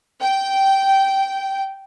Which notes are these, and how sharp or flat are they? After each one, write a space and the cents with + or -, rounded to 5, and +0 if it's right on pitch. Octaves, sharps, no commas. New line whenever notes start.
G5 -10